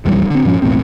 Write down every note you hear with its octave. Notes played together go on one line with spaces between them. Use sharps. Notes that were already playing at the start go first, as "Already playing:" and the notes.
B1 F2 E3 G3
D3 C4
G2 A#2 F3 C#4
B1 E2 A2 C4